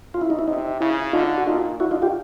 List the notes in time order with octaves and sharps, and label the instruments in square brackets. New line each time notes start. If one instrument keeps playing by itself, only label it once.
[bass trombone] C#3 [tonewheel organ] F4
[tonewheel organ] E4
D#4
E4
[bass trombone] C3 [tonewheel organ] D#4
[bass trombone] C#3 [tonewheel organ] E4
[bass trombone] D3 [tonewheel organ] D#4 F4
[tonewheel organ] F#4
[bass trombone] A#2 [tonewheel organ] D#4 F4
[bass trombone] D3 [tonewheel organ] E4 F#4
[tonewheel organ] D#4 F4
F4 G4